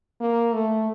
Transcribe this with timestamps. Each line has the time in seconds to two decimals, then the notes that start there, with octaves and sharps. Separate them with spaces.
0.20 A#3
0.53 A3